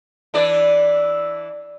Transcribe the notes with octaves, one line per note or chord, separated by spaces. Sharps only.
E3 D4 D5